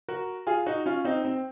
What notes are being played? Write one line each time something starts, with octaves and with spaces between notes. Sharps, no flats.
F#4 A#4
F4 G#4
D#4 F#4
C#4 F4
C4 D#4
C4